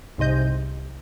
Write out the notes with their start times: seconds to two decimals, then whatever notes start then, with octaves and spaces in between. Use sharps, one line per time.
0.18 C2 G#2 C3 D#5 G6